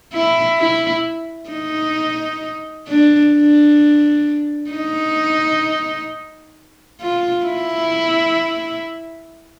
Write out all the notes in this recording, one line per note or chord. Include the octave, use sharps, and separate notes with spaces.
E4
E4
D#4
D4
D4
D#4
F4
E4